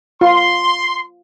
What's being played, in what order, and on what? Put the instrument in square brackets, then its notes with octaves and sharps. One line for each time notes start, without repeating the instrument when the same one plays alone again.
[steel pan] F4 [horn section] C6